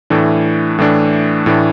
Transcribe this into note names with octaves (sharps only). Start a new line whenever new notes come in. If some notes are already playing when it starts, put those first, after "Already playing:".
A2 E3 A3 D4
A2 E3 A3 D4
A2 E3 A3 D4